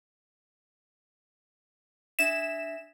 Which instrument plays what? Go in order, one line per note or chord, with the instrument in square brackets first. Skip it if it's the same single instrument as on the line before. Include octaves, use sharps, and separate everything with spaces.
[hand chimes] D4 E5 B6 [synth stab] E7